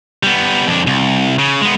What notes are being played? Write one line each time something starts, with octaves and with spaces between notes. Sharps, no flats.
G3 B3
F2 D4
C2
C#3
G#3 B3